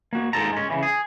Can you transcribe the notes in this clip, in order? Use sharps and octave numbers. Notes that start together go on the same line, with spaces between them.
A#3 F#4
G#2 D#3 A#3 A4 A5 A#5
G#3 C#4
C#3 E3
G#4